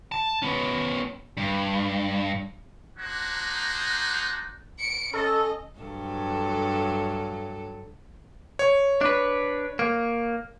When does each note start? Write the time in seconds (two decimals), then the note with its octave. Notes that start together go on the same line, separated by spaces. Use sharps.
0.12 A5
0.42 B3 C#4
1.37 G2
2.98 A#3 D4 D#4 F#4 C5
4.79 C#7 D7
5.13 C#4 A4 D#5
5.79 G2 F#3 A4
8.59 C#5
9.01 D4 B4
9.79 A#3